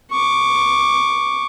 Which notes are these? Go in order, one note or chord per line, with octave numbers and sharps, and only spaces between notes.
C#6 D6